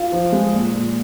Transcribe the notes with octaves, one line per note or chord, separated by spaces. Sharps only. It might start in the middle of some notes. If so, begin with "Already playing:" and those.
Already playing: F4
F3
G#3
A#2
A#2